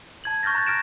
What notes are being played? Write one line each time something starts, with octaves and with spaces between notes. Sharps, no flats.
A5 G#6 F#7
C#6 F6 G6 A6 A#6
A#5 F#6 A6
F6 A#6 D7 E7